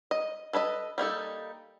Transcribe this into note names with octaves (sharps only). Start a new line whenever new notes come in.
D#5
A4 B4 C#5 D#5
G3 A#3 D#4 A4